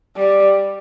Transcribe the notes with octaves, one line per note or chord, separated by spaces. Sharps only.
G3